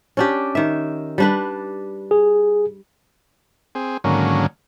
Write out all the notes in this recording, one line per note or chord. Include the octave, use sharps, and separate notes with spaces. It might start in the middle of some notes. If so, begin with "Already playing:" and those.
C#4 D4 G4
D#3 E5
G3 D4 B4
G#4
C4 G#4
G#2 D3 D#3 F#3 A#3 C#4